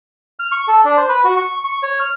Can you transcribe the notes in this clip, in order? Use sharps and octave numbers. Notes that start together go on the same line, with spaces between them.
F6
C#6
A4
D4
C5
B4
F#4
C#6
C#6
C#5
F6